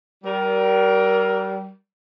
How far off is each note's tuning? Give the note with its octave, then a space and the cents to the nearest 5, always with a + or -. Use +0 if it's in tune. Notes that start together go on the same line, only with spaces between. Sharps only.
G3 -30 A#4 +15